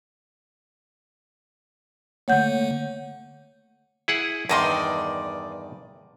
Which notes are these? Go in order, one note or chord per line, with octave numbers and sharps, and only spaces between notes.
D3 A3 A#3 C#5 F#5 G6
E4 G#4 F#5
E2 G2 D#3 D5 D#5 C6